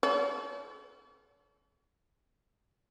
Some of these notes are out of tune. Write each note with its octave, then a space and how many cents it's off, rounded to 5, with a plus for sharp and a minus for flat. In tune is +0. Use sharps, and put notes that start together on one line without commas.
A4 -40 C#5 +45